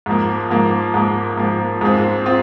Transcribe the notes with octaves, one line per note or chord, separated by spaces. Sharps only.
G#2 F3 A#3
G#2 F3 A#3
G#2 F3 A#3
G#2 F3 A#3
G#2 G#3 C4 F4
C4 F4